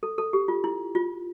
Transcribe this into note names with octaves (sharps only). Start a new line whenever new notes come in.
A4
A4
G4
F4
E4
F4